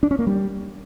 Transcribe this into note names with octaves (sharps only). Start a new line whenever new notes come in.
D4
C#4
A#3
G3